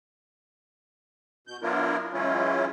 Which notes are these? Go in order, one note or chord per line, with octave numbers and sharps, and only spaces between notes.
B2 G6
F#3 B3 D4 E4 F4 A#4
E3 F#3 G#3 C#4 E4 F4